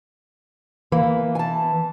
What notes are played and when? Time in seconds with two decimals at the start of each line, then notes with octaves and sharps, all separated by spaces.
0.92 E3 A#3
1.35 G#5 A5